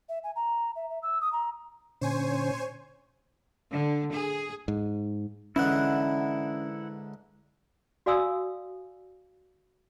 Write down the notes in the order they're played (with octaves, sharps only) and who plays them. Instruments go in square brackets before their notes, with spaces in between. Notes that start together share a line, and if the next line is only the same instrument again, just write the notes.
[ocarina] E5
G#5
A#5
E5
E5
E6
D#6
A#5
[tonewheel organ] A#2 D3 C#4 [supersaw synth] C5 C#5 G#5
[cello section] D3
G#4
[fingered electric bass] G#2
[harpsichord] G#2 D3 E3 [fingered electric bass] C#4 [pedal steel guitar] E4 F#5
[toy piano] F#4 D5 F5 G#5 D#6 E6